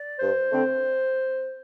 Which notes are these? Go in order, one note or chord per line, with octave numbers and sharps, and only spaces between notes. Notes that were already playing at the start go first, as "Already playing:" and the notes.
Already playing: D5
G2 C5
D3 A3 C4